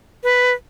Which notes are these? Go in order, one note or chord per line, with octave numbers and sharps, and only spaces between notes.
B4